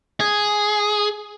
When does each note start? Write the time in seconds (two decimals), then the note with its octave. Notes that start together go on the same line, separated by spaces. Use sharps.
0.20 G#4